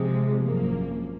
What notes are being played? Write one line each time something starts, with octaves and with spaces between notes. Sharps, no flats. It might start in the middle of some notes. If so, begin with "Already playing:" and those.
Already playing: C3 F3 G#3
G#1 F#2 F3 A#3